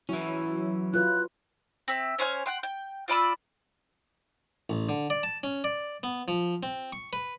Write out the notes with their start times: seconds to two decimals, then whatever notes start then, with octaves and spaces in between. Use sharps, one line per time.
0.09 E3 F#3 C#4 E4
0.94 F4 B4 F#6
1.88 C4 E5
2.19 C#4 C5 G#5 F6
2.46 F#5 G5 C6
2.63 G5
3.08 F4 D5 B5 E6
4.70 A1
4.89 D3
5.10 D5
5.23 A5
5.43 C#4
5.64 D5
6.03 B3
6.28 F3
6.63 C4
6.93 C#6
7.13 B4